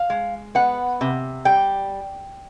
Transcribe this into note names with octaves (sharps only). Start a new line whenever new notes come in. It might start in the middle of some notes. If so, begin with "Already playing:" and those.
Already playing: F5
G#3
B3 F#5
C3
G3 G5